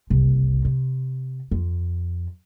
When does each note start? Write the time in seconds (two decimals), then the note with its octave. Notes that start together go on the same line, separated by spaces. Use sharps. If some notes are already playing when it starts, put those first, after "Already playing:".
0.10 F#1 C2
0.65 C3
1.51 F2